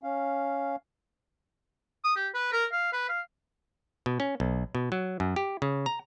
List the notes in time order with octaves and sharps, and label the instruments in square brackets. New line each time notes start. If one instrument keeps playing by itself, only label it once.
[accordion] C#4 F5
[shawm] D#6
G4
B4
A#4
F5
B4
F5
[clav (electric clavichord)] B2
C#4
B1
B2
F#3
F#2
G4
C#3
A#5